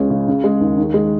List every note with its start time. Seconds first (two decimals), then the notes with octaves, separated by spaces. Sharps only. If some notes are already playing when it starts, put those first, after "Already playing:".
Already playing: C#2 G#3 C#4
0.10 C#3
0.28 C#3
0.44 G#3
0.61 D#2
0.77 D#3
0.94 G#3